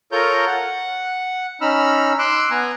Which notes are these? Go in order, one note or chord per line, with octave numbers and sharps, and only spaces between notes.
F4 A4 A#4 C#5 A#5 G6
F#5
C#4 D#4 B5 E6 F6
C6 D6 E6 F#6
B3 G#5 A#5